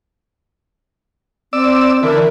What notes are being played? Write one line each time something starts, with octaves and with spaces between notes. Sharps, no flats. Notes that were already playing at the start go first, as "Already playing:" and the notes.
C4 D5 E6
D3 E3 A#4